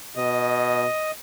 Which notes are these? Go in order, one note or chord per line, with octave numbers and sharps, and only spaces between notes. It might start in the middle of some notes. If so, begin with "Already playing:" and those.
B2 D#5